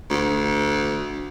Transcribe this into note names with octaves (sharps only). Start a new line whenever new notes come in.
D2